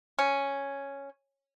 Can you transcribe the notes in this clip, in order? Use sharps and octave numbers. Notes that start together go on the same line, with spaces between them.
C#4